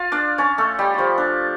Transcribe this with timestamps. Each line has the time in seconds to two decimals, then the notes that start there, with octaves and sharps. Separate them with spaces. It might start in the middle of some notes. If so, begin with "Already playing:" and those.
Already playing: F4 F5
0.12 D4 D5
0.38 C#4 C#5
0.58 A3 A4
0.79 G3 G4
0.94 F3 F4 G4
1.18 D4